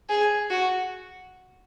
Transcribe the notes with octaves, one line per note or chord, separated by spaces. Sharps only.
G#4
F#4